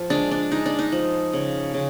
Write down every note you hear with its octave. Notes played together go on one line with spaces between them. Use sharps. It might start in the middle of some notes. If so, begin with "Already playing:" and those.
Already playing: F3
G#3 D4
D4
G#3 D#4
D4
D#4
F3
C#3
C#3